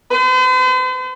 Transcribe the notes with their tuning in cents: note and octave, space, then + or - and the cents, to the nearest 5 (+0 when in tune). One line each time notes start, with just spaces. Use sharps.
C5 -45